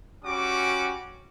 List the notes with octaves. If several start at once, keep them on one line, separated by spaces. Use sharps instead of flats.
G3 C#4 F#4 D6